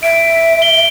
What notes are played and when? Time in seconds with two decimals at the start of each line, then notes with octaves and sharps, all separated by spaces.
0.03 E5 D7
0.62 G7